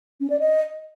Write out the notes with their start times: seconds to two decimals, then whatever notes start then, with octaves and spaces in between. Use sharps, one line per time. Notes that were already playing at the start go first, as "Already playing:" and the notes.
0.20 C#4
0.30 D5
0.40 D#5